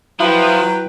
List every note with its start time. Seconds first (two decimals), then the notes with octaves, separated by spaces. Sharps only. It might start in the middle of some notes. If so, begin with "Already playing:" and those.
0.20 F3 F#3 E4 B4 G5